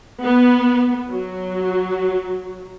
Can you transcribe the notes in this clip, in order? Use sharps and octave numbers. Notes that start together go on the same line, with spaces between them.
B3
F#3